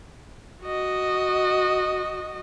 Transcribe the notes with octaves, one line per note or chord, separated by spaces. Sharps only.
F#4 D#5